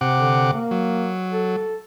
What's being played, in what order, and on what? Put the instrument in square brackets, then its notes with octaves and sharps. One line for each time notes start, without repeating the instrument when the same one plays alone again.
[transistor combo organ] C3 F#5 D6
[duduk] D3
A#3
[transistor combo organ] F#3
[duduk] A4